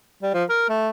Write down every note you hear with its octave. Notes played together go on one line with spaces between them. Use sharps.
G3
F3
A#4
A3